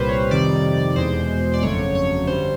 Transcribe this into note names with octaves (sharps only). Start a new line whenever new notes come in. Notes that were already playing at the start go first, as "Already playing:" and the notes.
Already playing: C2 A#2 G3 B4 C5
C#5
F2 C3 D#3 G3 D5
E2 B2 G#3 C5
D5
G1 F2 C#3 F#3 A3 C#5
C#5
G2 D3 G3 C5